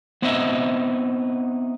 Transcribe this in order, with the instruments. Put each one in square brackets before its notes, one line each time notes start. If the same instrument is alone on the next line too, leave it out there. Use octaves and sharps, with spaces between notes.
[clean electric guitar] B3 C4 D#4 B4 D#5 E5